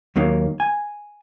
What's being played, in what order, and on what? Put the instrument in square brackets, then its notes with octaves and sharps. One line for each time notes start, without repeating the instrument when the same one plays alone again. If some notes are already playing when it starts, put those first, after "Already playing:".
[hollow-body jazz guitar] D#2 F#3 A#3 D#4
G#5